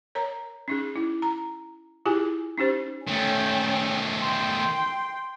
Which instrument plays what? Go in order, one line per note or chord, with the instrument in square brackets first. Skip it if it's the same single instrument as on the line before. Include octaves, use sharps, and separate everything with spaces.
[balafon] A#4 C#5 A#5
C#4 D#4 G#4
E4
A#5
E4 F4 G4 G#4 G#5
C#4 D#4 G4 C5
[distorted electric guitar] D#3 A3 [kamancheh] C#4 G5
[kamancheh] G5 [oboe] C6